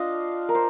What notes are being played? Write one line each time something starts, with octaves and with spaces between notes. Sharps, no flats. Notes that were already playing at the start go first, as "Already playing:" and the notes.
Already playing: D4 F4 D#5 F5
A#4
C5